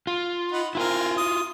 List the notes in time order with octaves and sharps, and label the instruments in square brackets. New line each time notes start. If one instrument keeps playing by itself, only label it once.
[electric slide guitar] F4
[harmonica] D#4 F#5 B5
[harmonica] C4 A#4 G#5 [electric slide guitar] E4 F4
[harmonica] D#6